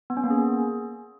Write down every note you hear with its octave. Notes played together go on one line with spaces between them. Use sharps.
B3
C#4
A#3
G#4